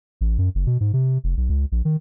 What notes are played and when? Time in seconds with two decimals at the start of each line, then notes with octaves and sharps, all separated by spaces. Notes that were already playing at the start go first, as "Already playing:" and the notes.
0.21 A1
0.38 F#2
0.55 F#1
0.67 B2
0.80 G#2
0.93 C3
1.24 F1
1.37 B1
1.49 C#2
1.72 A#1
1.85 D#3